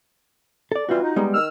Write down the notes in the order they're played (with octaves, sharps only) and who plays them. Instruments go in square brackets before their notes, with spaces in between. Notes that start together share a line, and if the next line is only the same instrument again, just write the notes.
[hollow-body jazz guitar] A4 D5
[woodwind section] E3 G3 C4 [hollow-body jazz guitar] F4 F#4
[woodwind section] D#4
[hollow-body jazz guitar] G3 G#3 B3
[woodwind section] D#3 E6 F6